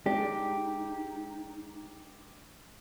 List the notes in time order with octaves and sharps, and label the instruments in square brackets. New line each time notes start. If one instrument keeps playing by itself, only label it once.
[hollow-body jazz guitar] G#3 D4 [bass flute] D#4 [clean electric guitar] G4